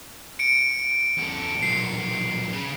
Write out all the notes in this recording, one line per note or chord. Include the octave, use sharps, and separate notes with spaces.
C#7 D7
E2 A4
B1 A#2 C7
C#3